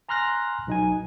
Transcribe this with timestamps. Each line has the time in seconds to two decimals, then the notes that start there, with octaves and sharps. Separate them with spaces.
0.09 G#5 A#5 C6 F6 F#6 A#6
0.67 B1 D#4 G#5